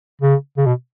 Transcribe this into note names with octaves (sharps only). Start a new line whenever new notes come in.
C#3
C#3
B2